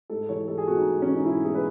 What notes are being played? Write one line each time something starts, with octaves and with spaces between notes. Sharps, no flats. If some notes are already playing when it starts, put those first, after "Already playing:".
G#2 A4
E3 C#5
G#2 A4
G#4
B3 F#4
D#4
G#2
E3 C#4
D#4
G#2 E4
B3 G#4
B4